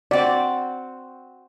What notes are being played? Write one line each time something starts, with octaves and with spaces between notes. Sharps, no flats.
C4 F#4 D5